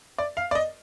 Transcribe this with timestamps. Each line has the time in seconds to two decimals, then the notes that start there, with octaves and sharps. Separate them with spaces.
0.18 D5
0.37 F5
0.51 D5
0.55 D#5